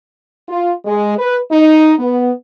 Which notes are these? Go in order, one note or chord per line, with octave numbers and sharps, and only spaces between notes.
F4
G#3
B4
D#4
B3